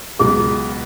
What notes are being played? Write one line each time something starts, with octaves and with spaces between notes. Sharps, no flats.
C#2 B2 F#3 G#4